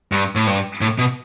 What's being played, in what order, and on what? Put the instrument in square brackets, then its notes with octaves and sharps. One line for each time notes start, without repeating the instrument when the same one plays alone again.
[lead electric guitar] G2
A2
G2
A2
B2